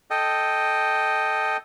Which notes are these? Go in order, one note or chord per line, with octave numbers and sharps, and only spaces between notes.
A4 D#5 G5